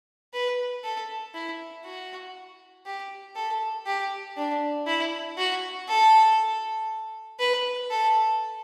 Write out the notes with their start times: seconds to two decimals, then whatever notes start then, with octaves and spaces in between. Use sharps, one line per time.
0.34 B4
0.84 A4
1.34 E4
1.85 F#4
2.86 G4
3.36 A4
3.86 G4
4.37 D4
4.87 E4
5.38 F#4
5.88 A4
7.39 B4
7.90 A4